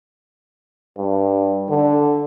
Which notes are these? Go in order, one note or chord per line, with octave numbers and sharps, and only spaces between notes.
G2
D3